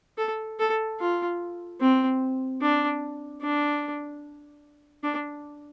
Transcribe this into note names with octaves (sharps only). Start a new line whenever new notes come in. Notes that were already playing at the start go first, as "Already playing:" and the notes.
A4
A4
F4
C4
D4
D4
D4